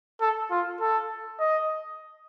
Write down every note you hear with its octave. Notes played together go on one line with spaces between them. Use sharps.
A4
F4
A4
D#5